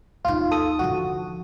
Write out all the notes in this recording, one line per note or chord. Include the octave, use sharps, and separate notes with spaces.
D#2 D#4 F4
A4 D#6
D3 F3 F#4